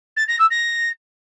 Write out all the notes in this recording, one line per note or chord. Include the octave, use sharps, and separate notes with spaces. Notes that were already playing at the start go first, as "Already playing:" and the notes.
A6
A#6
E6
A#6